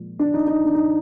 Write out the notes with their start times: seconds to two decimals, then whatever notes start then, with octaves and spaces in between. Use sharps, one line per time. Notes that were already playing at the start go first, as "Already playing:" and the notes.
Already playing: A#2 F3 G#3
0.19 D4
0.34 D#4
0.47 D#4
0.65 D4
0.75 D#4